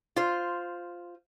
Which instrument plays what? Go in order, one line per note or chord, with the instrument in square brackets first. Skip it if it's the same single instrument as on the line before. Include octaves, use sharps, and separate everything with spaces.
[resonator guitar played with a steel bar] F4 C5